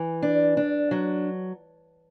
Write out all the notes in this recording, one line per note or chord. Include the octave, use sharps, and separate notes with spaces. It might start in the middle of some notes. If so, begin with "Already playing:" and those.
Already playing: E3
D4
D4
F#3